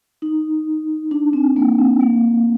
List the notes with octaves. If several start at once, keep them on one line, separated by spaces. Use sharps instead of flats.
D#4
D4
C4
A#3
C4
A#3